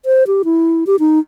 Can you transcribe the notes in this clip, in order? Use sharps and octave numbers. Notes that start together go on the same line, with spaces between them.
C5
G4
E4
G4
D#4